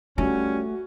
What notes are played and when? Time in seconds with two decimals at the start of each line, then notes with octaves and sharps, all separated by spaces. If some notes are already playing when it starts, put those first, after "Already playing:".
0.18 G3 A3 C#4 F4 F#4